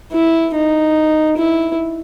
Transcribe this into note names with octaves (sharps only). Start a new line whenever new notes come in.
E4
D#4
E4